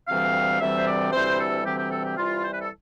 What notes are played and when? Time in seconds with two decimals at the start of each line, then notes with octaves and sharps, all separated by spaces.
0.08 D2 C3 E3 G3 C4 F5
0.60 D2 C3 E3 G3 C4 E5
0.77 C5
0.87 D5
1.12 D2 C3 E3 G3 C4 C5
1.39 A4
1.65 D2 C3 E3 G3 C4 G4
1.78 G4
1.91 A4
2.04 G4
2.17 C3 E3 G3 F4
2.43 C5
2.53 B4
2.61 A4